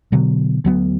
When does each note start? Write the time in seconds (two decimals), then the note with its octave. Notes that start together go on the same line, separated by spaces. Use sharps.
0.12 B2 D3 F#3 B3
0.65 D2 F#3 B3